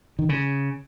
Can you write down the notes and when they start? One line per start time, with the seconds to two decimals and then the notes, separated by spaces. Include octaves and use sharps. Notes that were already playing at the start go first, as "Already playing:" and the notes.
0.19 D#3
0.29 C#3